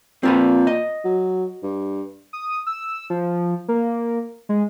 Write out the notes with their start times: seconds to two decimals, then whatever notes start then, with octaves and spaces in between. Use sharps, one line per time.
0.23 A#2 C4 F4 B4
0.67 D#5
1.05 F#3
1.63 G2
2.33 D#6
2.67 E6
3.10 F3
3.68 A#3
4.49 G#3